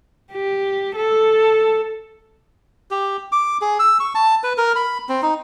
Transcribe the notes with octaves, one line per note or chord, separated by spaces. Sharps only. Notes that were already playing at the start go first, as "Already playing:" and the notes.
G4
A4
G4
D6
G#4
E6
C#6
A5
B4
A#4
B5
C4
D#4